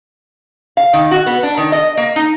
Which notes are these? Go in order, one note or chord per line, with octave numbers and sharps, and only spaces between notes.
F5
D#3
F#4
B3
D4
D#3
D#5
A#3
D#4